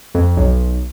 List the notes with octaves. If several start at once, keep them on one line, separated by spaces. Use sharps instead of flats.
F2
B1